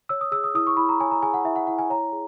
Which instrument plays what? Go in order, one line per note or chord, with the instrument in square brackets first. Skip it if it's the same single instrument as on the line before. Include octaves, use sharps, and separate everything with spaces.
[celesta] C#5 E6
D#6
G#4 E6
D#6
E4 D#6
C#6
E4 B5
A#5
C#5 G#5
A#5
G#4 G#5
F#5
E4 E5
F#5
E4 F#5
G#5
C#5 A#5
G#4